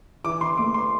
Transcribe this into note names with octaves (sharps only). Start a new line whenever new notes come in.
E3 D6
E3 C6
A3 D6
C6